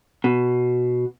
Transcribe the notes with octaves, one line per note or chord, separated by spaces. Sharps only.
B2